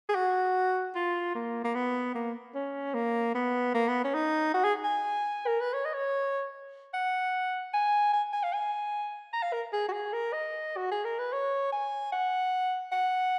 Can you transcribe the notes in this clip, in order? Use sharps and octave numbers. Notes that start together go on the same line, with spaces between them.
G#4
F#4
F4
A#3
A#3
B3
A#3
C#4
A#3
B3
A#3
B3
C#4
D#4
F#4
G#4
G#5
A#4
B4
C#5
D#5
C#5
F#5
G#5
G#5
G#5
F5
G#5
A#5
F5
A#4
G#4
F#4
G#4
A#4
D#5
F#4
G#4
A#4
B4
C#5
G#5
F#5
F#5